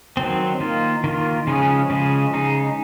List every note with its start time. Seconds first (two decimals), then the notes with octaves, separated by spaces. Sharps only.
0.17 D#3 F#3 C4
0.60 D#3 A#3 F4
1.04 D#3 A#3 F4
1.47 C#3 F3 G#3 C#4 G#4
1.90 C#3 F3 G#3 C#4 G#4
2.34 C#3 G#3 D#4 G#4